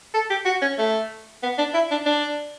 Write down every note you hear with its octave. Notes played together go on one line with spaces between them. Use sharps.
A4
G4
F#4
C#4
A3
B3
D4
E4
D4
D4